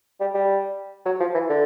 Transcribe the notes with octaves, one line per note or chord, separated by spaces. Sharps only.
G3
G3
F#3
F3
E3
D3